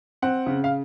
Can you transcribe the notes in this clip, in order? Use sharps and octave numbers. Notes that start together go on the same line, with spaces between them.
C4 F#5
C#3
F5